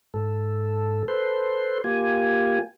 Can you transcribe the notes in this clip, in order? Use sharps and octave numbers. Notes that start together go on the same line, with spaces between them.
G#2 A4
A4 B4 C5 C6
A#3 F4 G4 G#5